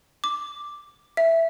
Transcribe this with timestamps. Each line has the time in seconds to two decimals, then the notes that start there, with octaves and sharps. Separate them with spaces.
0.24 D6
1.17 E5